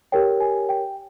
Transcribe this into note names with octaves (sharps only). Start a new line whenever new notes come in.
G4 A#4 C#5 G5
G#5
G5